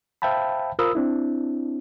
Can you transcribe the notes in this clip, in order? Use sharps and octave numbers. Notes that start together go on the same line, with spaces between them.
C5 E5 F5 G5 A5 B5
F4 A#4 C5 B5 D#6 E6
C4 D4 E4